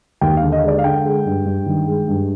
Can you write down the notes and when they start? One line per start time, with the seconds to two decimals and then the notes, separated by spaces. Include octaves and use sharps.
0.21 D#2 G5
0.37 F5
0.43 D3
0.52 D#5
0.63 G#3 D5
0.79 F5
0.84 D3 G5
1.04 G#3
1.26 G2
1.45 G2
1.66 D#3
1.86 G#3
2.08 G2